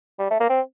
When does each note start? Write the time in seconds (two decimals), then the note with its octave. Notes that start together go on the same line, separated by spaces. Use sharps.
0.19 G3
0.31 A3
0.40 A#3
0.50 C4